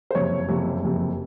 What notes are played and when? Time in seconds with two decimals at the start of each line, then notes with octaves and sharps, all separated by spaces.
0.11 C5
0.15 F#1 F2 C3 C#5
0.48 F#1 F2 C3
0.82 F#1 F2 C3